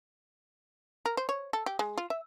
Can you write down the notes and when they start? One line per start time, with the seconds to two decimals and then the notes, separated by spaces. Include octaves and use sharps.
1.06 A#4
1.17 C5
1.29 C#5
1.53 A4
1.66 G4
1.79 G#3
1.98 F4
2.10 E5